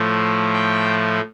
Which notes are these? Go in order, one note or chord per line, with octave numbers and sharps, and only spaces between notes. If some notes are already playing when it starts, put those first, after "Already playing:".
Already playing: A2 F3 A3
G5